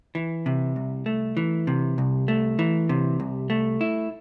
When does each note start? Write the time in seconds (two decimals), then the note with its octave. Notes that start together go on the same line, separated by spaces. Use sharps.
0.15 E3
0.46 C3
0.76 C2
1.06 A3
1.37 E3
1.67 C3
1.98 C2
2.28 A3
2.59 E3
2.89 C3
3.20 C2
3.50 A3
3.81 E4